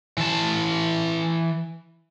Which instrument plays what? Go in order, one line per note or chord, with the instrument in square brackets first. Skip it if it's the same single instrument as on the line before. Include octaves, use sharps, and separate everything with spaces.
[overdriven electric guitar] E3 A5